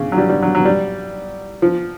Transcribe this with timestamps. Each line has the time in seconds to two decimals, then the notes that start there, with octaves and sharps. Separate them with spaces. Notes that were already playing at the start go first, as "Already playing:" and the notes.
Already playing: C#3
0.12 F#3
0.18 G3
0.30 G3
0.42 F#3
0.55 F#3
0.65 G3
1.62 F3